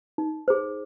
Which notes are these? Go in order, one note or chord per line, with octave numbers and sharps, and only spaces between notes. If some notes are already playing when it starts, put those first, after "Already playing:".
D#4
G#4 C5